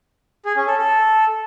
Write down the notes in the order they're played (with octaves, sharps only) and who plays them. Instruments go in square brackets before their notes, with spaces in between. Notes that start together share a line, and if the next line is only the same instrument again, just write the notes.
[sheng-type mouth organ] G#4
C#4
A4
A4